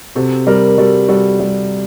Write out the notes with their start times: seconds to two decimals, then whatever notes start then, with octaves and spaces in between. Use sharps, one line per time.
0.15 C3 F#4 A4
0.47 G3 G4 A#4
0.78 G3 F#4 A4
1.08 G3 F#4 A4
1.40 G3